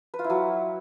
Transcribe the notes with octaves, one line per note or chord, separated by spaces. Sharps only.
B4
F4
E4
F#3